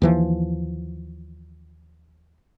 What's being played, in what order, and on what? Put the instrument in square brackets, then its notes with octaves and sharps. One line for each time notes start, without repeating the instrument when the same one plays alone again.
[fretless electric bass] D#2 E3 F3